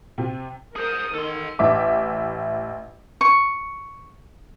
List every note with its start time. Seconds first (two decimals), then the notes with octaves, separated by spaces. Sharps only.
0.18 C3
0.76 G#4 A#4 C5 D#6
1.14 D#3 A4 C6
1.59 A1 E5 D6
3.21 C#6